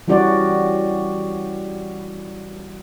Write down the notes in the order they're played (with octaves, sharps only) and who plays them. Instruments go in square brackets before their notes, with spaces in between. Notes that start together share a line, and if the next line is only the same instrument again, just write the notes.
[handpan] E3 G3 C#4 F#4 D5